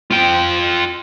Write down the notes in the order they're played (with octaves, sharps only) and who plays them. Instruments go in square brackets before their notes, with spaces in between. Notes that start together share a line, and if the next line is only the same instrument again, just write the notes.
[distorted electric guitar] F4 G5